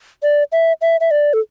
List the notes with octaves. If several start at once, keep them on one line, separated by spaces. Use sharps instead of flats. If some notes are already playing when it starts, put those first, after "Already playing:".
D5
E5
E5
E5
D5
A4